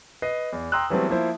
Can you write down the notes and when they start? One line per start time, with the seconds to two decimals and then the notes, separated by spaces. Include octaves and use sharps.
0.22 B4 D#5 C7
0.53 E2
0.72 G5 A#5 C6 D#6 E6 F#6
0.90 E3 F#3 G3 A3 B3 C4
1.09 F3 A#3 E4 C5